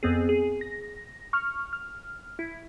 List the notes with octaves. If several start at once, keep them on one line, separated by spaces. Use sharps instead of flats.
F2 B3 C4 G#4
G#4
A#6
C#6 F6
F6
E4